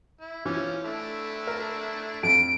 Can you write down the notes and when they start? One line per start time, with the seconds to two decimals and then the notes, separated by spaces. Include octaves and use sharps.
0.21 E4
0.46 E3 F3 C#4
0.85 A3 D4 E4
1.47 A#4
2.23 F2 D7